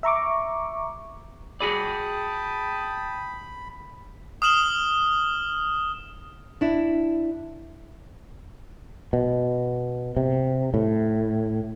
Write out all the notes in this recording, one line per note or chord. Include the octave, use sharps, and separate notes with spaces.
E5 A#5 C#6 D6
F#4 G#4 D5 G5 A5 B5 D#6
D#6 F6 E7 F#7 G7
D4 E4
B2
C3
A2